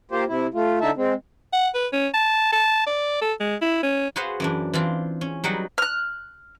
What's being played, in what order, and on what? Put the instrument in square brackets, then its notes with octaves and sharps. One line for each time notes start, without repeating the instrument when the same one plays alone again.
[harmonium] A#3 F4 G4 C5
C3 E4
A3 F4
D3 D#4 E4 E5 A5
G#3 C4
[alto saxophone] F#5
B4
C#4
A5
A5
D5
A4
G#3
E4
C#4
[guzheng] F#4 G#4 B4 C5 F5 F#5
F#2 E3 D4
E3 C4 D4 F4
C#4
F#3 G3 D#4 B4 F#5
[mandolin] F6 F#6